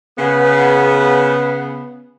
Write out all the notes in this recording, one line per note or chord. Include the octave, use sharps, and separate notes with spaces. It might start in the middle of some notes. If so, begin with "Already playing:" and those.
C#3 B3